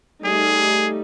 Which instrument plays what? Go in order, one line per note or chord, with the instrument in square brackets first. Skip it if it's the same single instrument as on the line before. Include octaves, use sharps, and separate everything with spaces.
[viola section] G3 A3 D#4 [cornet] G#4